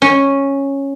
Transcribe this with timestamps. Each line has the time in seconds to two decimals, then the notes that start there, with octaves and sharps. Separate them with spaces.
0.02 C#4